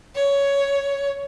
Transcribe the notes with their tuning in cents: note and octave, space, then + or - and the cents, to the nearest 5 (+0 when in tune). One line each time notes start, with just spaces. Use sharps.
C#5 +10